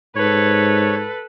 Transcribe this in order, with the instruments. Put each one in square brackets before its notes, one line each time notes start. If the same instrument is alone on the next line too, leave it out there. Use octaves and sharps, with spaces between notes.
[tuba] G#2 [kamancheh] A4 B4 [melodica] C#5